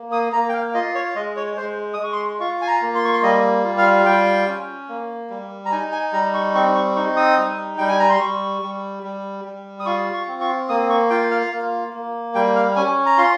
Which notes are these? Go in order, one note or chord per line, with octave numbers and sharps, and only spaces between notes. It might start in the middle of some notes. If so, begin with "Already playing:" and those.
Already playing: A#3
D#6
A#3 A#5
G5
F5
F4 D#5
C#5
G#3 D#5
C#5
G#3 C5
D#6
G#3 C#6
C6
F4 C#6
G#5
A#5
A#3
C6
C#6
C6
G3 D#5
F4
F5
G3 G5
C#4
A#3
G3
A#5
D#4 G#5
G#5
G3 A#5
C#6
C4 C#6
C#6
D#4 C#6
D#6
G3
G3 G5
G#5
A#5
C6
G3 C#6
G3
G3
G3
D#6
F4 C#6
C#6
C4
C#6
A#3 D#6
C#6
F4 G5
F5
A#3
A#3
G3 G5
F5
C#4 G#5
A#5
F4 C6